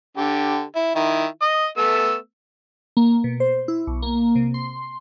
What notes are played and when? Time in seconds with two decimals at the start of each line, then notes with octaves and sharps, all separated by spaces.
0.17 D3 G4
0.76 E4
0.96 D#3 E4
1.42 D#5 D#6
1.78 A3 B3 E6
2.97 A#3
3.24 B2
3.40 C5
3.68 E4
3.87 B1
4.02 A#3
4.35 C3
4.54 C6